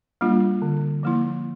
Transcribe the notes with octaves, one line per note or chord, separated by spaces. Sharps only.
G3 A#3 D4 F4
D3
F3 A#3 E4